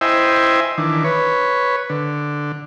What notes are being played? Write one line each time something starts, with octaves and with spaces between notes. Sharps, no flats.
E4 C5 D#5 E5 G5 G#5
D#3 E3 D4
B4 C#5
D3